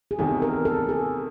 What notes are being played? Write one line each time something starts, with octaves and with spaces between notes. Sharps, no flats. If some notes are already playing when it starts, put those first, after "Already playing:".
G#4
E2 C3 D#3 A4
A#4
A4
G#4